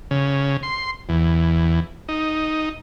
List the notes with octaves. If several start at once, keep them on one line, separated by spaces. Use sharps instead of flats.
C#3
C6
E2
D#4